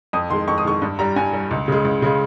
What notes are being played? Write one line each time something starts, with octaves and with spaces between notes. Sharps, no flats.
F2 D#6
D#3 G#3 C6
F2 C#6
D#6
D#3 G#3 C#6
G2
G3 A#5
G2 G#5
G3
C#2
C#3 G#3
C#2
C#3 G#3